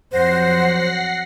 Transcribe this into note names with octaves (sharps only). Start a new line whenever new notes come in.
F2 F#3 C5 F#5 A#6 C7